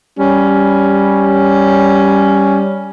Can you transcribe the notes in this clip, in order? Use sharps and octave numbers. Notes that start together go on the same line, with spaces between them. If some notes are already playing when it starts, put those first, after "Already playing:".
G3 C#4